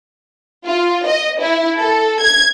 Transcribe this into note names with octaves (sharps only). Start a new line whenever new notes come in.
F4
D#5
E4
A4
G#6